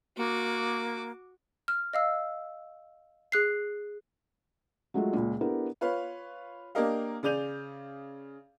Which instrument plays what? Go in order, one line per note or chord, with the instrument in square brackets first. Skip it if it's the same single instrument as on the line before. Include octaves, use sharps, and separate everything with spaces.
[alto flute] A#3 [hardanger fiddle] F#4 D6
[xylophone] F6
D#5 F5 E6
G#4 F#6 C7
[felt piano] F#3 G#3 A3 F4
C#2 A#2
B3 D4 E4 G4 A4 A#4
[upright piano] F4 B4 C#5 F5
A#3 D4 G4 A#4 D#5 F5
C#3 G#4 D5 G6 D#7 F7